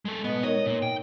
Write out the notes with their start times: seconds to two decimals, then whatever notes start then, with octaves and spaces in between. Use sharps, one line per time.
0.05 G#3 A4
0.24 B2 G#3 B3
0.43 D#4 A#4 C#5 D#5
0.66 A#2
0.82 G5